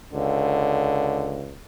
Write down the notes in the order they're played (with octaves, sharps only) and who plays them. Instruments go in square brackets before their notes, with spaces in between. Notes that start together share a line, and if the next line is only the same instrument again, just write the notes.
[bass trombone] C#2 [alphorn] D3